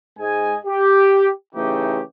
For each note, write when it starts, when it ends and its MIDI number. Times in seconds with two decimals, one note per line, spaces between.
0.19 0.56 44
0.19 0.56 56
0.19 0.56 75
0.19 0.56 80
0.66 1.30 67
1.54 2.02 49
1.54 2.02 52
1.54 2.02 57
1.54 2.02 63
1.54 2.02 67